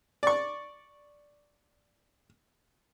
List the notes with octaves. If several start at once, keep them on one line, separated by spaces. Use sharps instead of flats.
D5 C#6